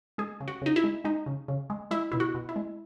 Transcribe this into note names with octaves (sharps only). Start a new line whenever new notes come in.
G#3 G#4
C#3
F#4
C#3 D#4
E4
G#3
G#3 D#4
C#3
C#3
G#3
G#3 E4
B2 E4
F#4
B2
E4
G#3